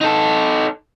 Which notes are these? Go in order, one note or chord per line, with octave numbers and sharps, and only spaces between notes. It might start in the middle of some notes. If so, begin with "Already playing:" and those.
D#4 A4